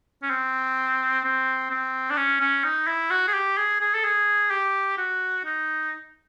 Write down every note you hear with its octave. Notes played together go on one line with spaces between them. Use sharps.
C#4
C4
C4
C4
D4
C#4
C#4
D#4
E4
F#4
G#4
G4
G#4
G#4
A4
G#4
G4
F#4
D#4